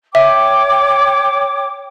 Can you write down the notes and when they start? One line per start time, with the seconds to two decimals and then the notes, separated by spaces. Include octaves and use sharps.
0.15 C#5 E5 G5 D6